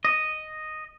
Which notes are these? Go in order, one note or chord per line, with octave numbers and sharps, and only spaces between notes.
D#5